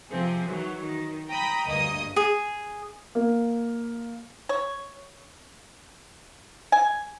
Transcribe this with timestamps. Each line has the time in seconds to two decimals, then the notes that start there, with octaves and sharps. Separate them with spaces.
0.10 C3 F3 C4 G#4
0.48 D#3 E3 F#3
0.79 D#3
1.29 G5 A#5 B5 D#6
1.68 D2 G2 A#3 D#5 D#6
2.16 G#4
3.15 A#3
4.49 C#5
6.72 G#5